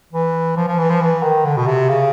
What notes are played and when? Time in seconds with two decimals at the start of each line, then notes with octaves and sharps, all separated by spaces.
0.13 E3
0.56 F3
0.68 F3
0.78 E3
0.90 F3
1.01 E3
1.22 D#3
1.45 D3
1.57 B2
1.67 C3
1.89 C#3